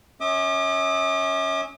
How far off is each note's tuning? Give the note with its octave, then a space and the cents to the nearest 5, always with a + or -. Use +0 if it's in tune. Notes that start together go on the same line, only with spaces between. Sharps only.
C#4 +0 E5 -40 D6 +40